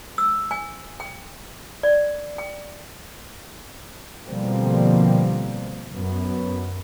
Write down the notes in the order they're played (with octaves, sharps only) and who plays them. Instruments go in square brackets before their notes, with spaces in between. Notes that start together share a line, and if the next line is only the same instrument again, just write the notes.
[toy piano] E6
G#5
G5
D5
G5
[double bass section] B2 D3 F3 G3 A#3 C4
F#2 B3